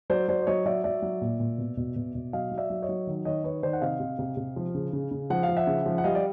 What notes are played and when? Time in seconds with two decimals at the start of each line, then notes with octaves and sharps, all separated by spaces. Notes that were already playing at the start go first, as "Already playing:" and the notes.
0.10 F#3 C5 D5
0.28 F#3 C5 D5
0.42 D5
0.47 F#3 C#5 D#5
0.66 F#3 D5 E5
0.84 F#3 D5 E5
1.02 F#3
1.21 A#2
1.40 A#2
1.58 B2
1.77 B2
1.96 B2
2.15 B2
2.33 F#3 D#5 F5
2.51 F#3
2.57 D5 E5
2.70 F#3
2.82 C#5 D#5
2.89 F#3
3.07 D#3
3.25 D#3 C#5 D#5
3.44 D#3 B4 C#5
3.63 D#3 C5 D5
3.73 F#5
3.81 C3 D#5 F5
4.00 C3
4.19 C3
4.37 C3
4.56 F3
4.75 C#3
4.93 C#3
5.11 C#3
5.30 F3 F#5
5.43 F5
5.48 F3
5.57 E5 F#5
5.67 C#3
5.86 F3
5.98 F#5
6.04 G3 D#5 F5
6.15 D5